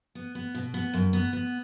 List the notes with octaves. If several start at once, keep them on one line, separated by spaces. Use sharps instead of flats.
B3
B3
B2
B3
F#2
B3
B3